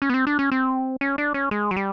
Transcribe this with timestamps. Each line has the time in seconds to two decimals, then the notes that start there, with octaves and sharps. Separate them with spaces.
0.02 C#4
0.10 B3
0.14 C4
0.27 D4
0.39 C#4
0.52 C4
1.01 C#4
1.18 D4
1.34 C#4
1.51 G#3
1.71 F#3
1.77 G3